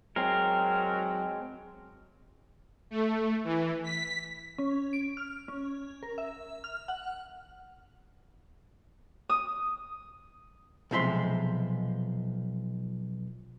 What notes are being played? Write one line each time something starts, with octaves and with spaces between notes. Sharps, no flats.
F#3 G#3 C4 A#4
A3
E3
B6
C#4
D7
F6
C#4
A#4
E5
F6
F#5
D#6
B1 C3 F3 G#3 E5 C6